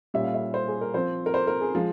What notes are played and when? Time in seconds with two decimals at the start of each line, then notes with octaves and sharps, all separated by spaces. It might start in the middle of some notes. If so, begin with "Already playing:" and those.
0.14 A#2 G3 C#4 E5
0.24 F5
0.34 E5
0.54 C5
0.68 G#4
0.81 A#4
0.94 F3 C4 C5
1.26 A#4
1.34 C5
1.47 A#4
1.61 G#4
1.75 F3 G#3